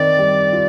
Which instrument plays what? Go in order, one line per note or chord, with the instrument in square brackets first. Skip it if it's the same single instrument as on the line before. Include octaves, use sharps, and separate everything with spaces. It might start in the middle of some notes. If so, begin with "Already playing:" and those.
Already playing: [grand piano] D#3 C4 [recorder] D5
[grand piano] G3
F4